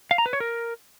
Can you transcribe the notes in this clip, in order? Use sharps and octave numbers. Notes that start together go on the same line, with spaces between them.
F5
A#5
B4
C#5
A#4